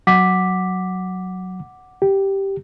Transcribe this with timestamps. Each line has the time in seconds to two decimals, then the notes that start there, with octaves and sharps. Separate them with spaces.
0.07 F#3 F#5 D6 B6
2.02 G4